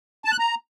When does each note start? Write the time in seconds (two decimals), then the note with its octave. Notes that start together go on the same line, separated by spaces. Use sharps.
0.25 A5
0.32 F#6
0.39 A#5